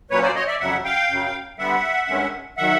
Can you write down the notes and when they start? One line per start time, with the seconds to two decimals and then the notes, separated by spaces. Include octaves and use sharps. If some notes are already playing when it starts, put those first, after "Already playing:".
0.10 A#2 F#3 A#3 C#4 B4 C#5
0.23 C5 D5
0.35 C#5 D#5
0.47 D5 E5
0.60 F2 C#3 F#3 E5 F#5
0.84 F5 G5
1.09 F#2 C#3 F#3
1.58 D3 G3 B3 E5 F#5
2.08 G2 D#3 G#3 C#4
2.57 D#3 F#3 E5 F#5